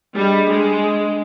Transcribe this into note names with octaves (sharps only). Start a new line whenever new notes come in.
G3 D4 G#4 D#5
G#3